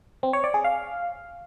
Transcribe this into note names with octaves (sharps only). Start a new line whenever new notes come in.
C4
C#5
D5
G#4
F5